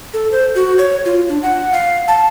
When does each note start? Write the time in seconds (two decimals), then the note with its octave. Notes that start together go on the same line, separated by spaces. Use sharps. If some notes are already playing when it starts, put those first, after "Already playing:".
0.13 A4
0.32 C5
0.55 F#4
0.78 C#5
1.05 F4
1.29 D4
1.43 F#5
1.72 F5
2.08 A5